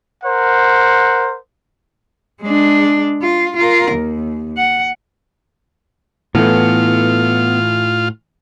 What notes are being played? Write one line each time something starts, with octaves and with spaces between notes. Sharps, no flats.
A#4 C5 F#5
G#3 D4
F4
F4 A#4
D#2
F#5
A2 E3 A3 B3 F4